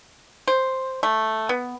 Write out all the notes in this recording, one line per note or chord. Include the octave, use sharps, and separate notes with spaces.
C5
A3
B3